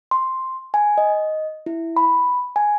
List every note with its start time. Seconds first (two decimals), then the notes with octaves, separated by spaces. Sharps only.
0.11 C6
0.74 G#5
0.98 D#5
1.66 E4
1.97 B5
2.56 G#5